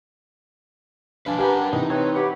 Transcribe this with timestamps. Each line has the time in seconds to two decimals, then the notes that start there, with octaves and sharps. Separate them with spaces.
1.26 B2 F3 D4 B4 F5 G#5
1.39 G4 A#4 B4 F5 F#5 G#5 A#5
1.73 C3 E3 D#4
1.90 C4 B4 C#5
2.15 G4 B4 C#5 F#5